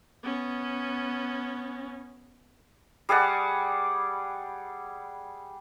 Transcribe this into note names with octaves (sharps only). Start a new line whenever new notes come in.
B3 C#4
G3 G#4 D5 F#5